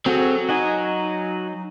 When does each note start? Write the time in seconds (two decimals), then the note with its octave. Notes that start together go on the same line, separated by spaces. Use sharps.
0.06 F#3 C4 F#4 G#4 A4
0.49 D#4 F#4 D#5 G#5